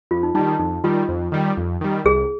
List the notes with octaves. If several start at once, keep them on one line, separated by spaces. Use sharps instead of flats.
F2 F4
D#4
D#3 G3 D#4
D#4
F2 D#4
D#3 G3 F4
F2
D#3 G3
F2
D#3 G3
C2 G#4